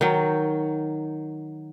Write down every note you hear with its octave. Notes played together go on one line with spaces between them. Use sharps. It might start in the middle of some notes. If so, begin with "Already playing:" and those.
D#3 F#3